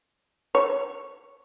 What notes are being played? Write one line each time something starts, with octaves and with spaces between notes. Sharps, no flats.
C#5